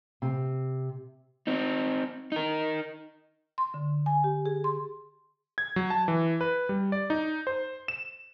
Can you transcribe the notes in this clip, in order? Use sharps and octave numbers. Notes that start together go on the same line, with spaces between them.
C3
C4 D#4
D#4 A#4
C6
D3
G#5
G4
G#4
C6
G#6
F#3
A5
E3
B4
G3
D5
D#4
C5
E7